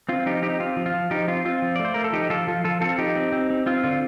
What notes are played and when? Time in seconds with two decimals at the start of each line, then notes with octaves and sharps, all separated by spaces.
0.09 C4 F4
0.26 F3 D#4 G4
0.42 C4 D#4 G4
0.60 C4 F4
0.77 F3
0.86 F4
0.94 F3
1.11 F3 D#4 G4
1.28 C4 F4
1.45 C4 F4
1.62 F3
1.76 A3 D5
1.85 C5
1.94 A3 A#4
2.04 A4
2.13 F3 D#4 G4
2.30 F3 F4 A4
2.47 F3 F4
2.64 F3 F4 A4
2.81 C4 F4 A4
2.99 F3 D#4 G4
3.16 C4
3.32 C4
3.50 C4
3.66 C4 F4
3.84 D3 F4